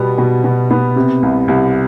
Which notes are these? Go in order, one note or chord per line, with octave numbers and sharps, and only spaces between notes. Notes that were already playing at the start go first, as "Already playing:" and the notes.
Already playing: B2 G3 B3
B2
B2
B3
C3
C2
C2